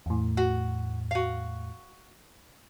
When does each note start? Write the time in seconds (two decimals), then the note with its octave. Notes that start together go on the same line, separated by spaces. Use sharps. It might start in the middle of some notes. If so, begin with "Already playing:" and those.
0.06 E2 A2
0.37 F#4
1.11 F#4 F5